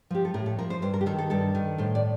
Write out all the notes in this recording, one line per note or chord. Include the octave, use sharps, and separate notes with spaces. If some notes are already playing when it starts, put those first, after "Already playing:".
F3 G4
A4
A2 A#4
A4
F3 A#4
C5
G2 C5
A#4
G4
D#3 A4
A4
G2 A4
D#3
A2 C5
D5